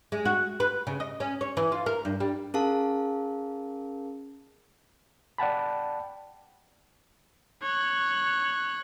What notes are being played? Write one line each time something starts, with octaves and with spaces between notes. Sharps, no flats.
G#3
F#4
B4
C#3
D#5
C#4
C#5
E3
F4
A#4
G2
G3
C#4 G#4 A#4 F5 A5
D5 F#5 G5 A5 B5
C#5 F#6